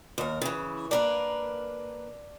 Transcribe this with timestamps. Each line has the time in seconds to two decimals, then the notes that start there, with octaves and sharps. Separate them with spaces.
0.18 D#2 A#4
0.42 C#3 E3
0.91 A#3 D4 A#4 B4